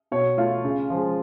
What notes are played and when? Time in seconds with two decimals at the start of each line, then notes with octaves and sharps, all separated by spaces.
0.12 B2 C#5
0.38 A3 F4
0.64 C#3
0.90 F3 G#3